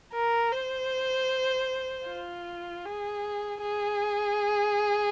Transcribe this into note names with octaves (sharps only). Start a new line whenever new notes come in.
A#4
C5
F4
G#4
G#4